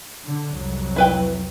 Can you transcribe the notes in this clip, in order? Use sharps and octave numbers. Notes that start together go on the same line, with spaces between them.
D3
C2 F2 F#3
E4 B4 G5